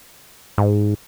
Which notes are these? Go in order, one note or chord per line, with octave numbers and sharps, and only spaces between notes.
G#2